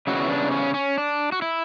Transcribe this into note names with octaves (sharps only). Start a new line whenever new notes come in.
C#3 E3 G3 B3 F#4
E4
D4
C#4
C#4
D4
F#4
E4